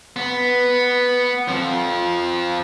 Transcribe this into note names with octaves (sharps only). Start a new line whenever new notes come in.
B3
F2 F3